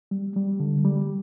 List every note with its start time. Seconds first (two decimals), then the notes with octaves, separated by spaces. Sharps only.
0.11 G3
0.36 G3
0.60 D3
0.85 G3